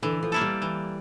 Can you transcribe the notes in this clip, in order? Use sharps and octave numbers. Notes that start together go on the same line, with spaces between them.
D3 E3
F3
A#3 E4 A4
G3
E3